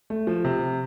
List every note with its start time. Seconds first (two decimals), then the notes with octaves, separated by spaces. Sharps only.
0.10 A3
0.27 F3
0.44 C3